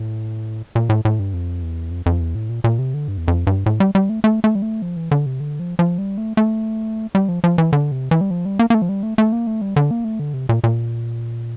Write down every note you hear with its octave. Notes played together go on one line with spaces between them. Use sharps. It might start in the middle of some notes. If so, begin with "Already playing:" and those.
Already playing: A2
A#2
A2
A2
G2
F2
E2
F2
F2
E2
A2
A#2
A#2
C3
D3
G2
E2
F2
G2
A2
G3
G3
A3
A3
A3
G3
A3
F3
E3
D3
C3
D3
F3
F3
G3
A3
A3
G3
F3
F3
E3
D3
C3
E3
G3
F3
G3
A#3
A#3
A3
F3
G3
A3
A3
A#3
A3
G3
D3
A#3
A3
D3
C3
A#2
A#2